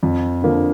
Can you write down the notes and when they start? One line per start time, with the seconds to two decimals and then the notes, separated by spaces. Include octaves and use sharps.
0.03 F2
0.42 D3 F3 A#3